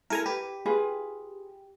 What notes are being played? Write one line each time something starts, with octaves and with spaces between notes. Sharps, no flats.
E4 A4 A#4 G#5 A#5
G4 B4
F4 G#4 B4